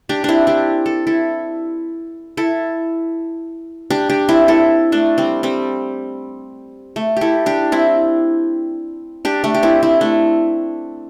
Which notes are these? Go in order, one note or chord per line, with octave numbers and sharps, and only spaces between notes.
D4 G4
C4 D4 E4
D4 G4
A4
E4 A4
E4 A4
D4 G4
D4 G4
C4 E4
E4 A4
A3 D4
G3 C4
G3 C4
A3
E4 G4 A4
D4 G4
C4 E4
D4 G4
A3 D4
G4
C4 E4
C4 E4
A3 D4